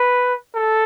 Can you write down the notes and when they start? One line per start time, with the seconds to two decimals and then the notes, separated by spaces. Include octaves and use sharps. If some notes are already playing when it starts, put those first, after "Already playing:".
Already playing: B4
0.55 A4